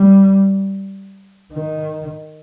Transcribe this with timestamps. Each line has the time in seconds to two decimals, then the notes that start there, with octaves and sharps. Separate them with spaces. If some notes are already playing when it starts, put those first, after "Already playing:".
Already playing: G3
1.53 D#3